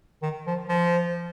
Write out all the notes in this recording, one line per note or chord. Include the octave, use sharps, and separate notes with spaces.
D#3
F3
F3